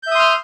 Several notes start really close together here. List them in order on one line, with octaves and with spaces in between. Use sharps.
G6 E5 D#6 C6 F6